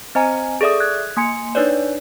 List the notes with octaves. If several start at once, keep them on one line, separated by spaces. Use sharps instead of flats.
C4 C5 D#5 G#5 A#5
G#4 A4 D5 E5 D#6
F#6 G#6
A#3 G#5 C6 C#7
D4 D#4 B4 C#5 D5